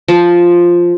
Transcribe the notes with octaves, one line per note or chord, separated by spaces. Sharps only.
F3